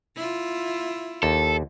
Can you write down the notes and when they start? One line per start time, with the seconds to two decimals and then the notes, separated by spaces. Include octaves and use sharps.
0.16 E4 F4
1.23 D#2 A4